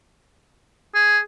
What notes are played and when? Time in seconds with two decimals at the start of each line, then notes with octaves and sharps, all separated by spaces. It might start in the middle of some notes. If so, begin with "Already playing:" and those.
0.94 G#4